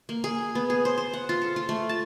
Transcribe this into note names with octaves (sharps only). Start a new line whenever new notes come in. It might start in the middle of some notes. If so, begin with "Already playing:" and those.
A#3
G#4
B3
G#4
C5
C5
F#5
F4
A4
F4
A3
A5